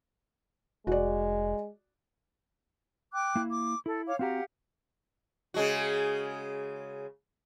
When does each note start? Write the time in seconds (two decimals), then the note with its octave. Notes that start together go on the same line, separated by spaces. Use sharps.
0.87 F1 G#3 F#4 D5
3.12 G5 D6 F#6
3.36 A#3 E4
3.52 D6
3.86 E4 A4
4.07 C#5 F5 D6
4.19 C4 F#4 G4 F5 F#5 A#5
5.54 C#3 G#3 F#4